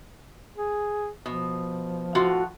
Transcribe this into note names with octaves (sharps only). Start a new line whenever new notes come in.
G#4
B2 F3
A2 F4 F#4